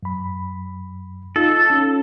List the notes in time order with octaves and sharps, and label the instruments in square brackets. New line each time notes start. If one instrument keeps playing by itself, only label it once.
[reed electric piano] F#2 B5
[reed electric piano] D#4 F4 [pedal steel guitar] A4
[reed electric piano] C#4